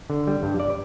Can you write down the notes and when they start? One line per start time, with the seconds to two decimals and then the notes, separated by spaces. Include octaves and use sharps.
0.10 D3
0.27 G3
0.43 G2
0.60 D5